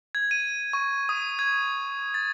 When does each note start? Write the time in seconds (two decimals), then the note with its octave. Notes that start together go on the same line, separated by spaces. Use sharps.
0.15 G#6
0.31 D#7
0.73 C#6
1.09 D#6
1.39 G#6
2.14 A6